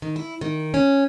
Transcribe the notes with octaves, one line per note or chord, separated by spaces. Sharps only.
D#3
E4
D#3
C#4